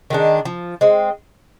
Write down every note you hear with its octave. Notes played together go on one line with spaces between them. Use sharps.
D#3 G#3 D4
F3
G#3 C4